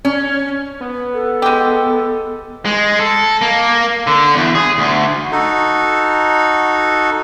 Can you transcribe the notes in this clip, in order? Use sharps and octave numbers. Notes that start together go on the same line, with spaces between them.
C#4
B3
A4
G#3 G4
G#3
A4
A#3
D3
E2
G#4
D2
D#4 F#4 A4